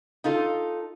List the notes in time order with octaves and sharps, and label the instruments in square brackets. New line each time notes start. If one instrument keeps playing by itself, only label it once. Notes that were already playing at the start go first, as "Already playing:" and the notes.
[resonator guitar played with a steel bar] D#4 F4 A4